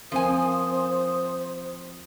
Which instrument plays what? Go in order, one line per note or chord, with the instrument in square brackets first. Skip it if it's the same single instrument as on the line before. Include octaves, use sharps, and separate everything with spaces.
[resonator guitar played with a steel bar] F3 G#5 [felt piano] C4 A#4 [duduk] C5 [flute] D#6